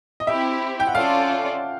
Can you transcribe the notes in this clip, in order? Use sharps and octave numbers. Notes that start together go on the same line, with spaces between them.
D#5
C4 E4 G4 E5
G5
F#5
C#4 F4 A4 D5 F5